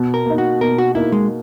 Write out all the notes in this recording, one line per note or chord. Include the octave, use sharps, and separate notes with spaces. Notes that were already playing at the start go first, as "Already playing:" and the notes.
Already playing: B2
A#4
A#3 D#4
F#4
B2 A#4
F#4
A#3 D#4 E4
G#3